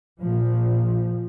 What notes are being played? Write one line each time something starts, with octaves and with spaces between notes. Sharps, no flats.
A#2 F3